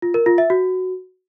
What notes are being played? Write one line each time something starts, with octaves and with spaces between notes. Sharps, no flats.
F4
A#4
F4
E5
F#4